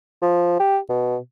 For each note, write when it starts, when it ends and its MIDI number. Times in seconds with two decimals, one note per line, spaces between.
0.22 0.59 53
0.60 0.78 67
0.89 1.17 47